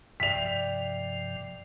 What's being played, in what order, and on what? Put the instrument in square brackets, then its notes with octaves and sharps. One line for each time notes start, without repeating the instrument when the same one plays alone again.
[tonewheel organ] G2 C3 F3 [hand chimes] D5 E5 G5 [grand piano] B6 F7